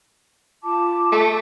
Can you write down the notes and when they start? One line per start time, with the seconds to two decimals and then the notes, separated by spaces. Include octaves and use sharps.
0.63 F4 A5 D6
1.12 A3